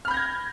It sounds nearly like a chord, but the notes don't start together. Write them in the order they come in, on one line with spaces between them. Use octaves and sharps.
F6 B5 G6 A#6 G#6